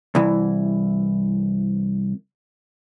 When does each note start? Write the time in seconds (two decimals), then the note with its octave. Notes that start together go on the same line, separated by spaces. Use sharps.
0.15 C2 E3